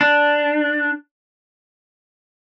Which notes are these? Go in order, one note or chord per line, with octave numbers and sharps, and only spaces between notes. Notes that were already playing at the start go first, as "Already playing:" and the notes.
D4